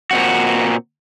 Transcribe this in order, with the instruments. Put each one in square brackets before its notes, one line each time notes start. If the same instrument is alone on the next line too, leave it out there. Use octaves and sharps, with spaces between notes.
[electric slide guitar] A#2 C4 F#4